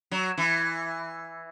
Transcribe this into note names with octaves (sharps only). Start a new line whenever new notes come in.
F#3
E3